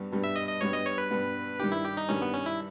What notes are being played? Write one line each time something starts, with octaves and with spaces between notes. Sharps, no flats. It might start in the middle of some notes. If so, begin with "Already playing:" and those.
Already playing: G2 G3 B3
G2 G3 B3
E5
D#5
D#5
G2 G3 B3 C#5
D#5
C#5
B4
G2 G3 B3
G2 D#3 G3 G4
E4
G4
D#4
G2 D#3 G3 C#4
B3
C#4
E4